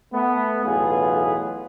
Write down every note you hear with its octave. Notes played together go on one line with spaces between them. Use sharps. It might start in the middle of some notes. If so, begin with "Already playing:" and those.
A3 B3
B1 E2 A2 B3 F4 G#4